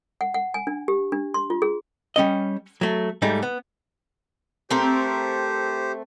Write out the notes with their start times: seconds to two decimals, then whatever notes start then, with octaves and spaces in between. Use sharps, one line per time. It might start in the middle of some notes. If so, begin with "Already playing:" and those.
0.21 F#5
0.34 F#5
0.54 G#5
0.67 D4
0.88 G4
1.12 D4
1.34 C6
1.50 F4
1.62 G#4
2.16 G3 C#4 D#5
2.81 F#3 A3
3.22 G#2 G3 A3 D#4
3.43 B3
4.70 A3 C4 G4 A#4 C5